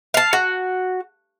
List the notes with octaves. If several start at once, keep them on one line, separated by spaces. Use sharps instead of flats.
F5 A5
F#4